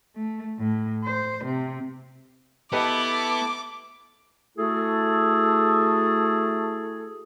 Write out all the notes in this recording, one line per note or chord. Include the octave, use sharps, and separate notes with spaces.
A3
A2
C5
C3
B3 E4 G4 A4 B4 D#5 A5 D6
A3 E4 F#4 G#4 A4